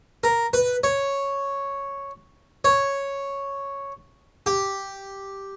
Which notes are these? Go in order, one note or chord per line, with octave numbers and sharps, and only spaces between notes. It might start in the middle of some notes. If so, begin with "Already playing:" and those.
A#4
B4
C#5
C#5
G4